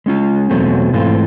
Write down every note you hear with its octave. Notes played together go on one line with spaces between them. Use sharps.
G#3 C#4 F4
E2 B2 F#3 A3 C4
G#2 E3 A3 C4 F4